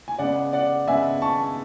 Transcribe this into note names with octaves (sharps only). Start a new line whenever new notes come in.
G#5
C#3 G#3 B3 D5 F#5
D5 F#5
C#3 G#3 B3 E5 G#5
A5 C#6